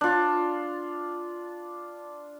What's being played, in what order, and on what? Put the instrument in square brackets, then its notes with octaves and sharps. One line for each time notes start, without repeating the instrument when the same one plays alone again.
[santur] D4 F4